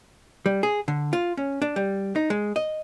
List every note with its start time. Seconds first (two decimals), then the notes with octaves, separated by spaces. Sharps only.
0.46 G3
0.63 G#4
0.88 D3
1.13 F4
1.37 C#4
1.62 D4
1.76 G3
2.16 D#4
2.30 G#3
2.56 D#5